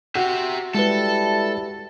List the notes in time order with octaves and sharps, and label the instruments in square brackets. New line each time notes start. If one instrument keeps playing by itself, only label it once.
[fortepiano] F#4 [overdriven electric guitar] G4 E5
[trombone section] G3 E4 [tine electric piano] G#3 B4 [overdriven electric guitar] A4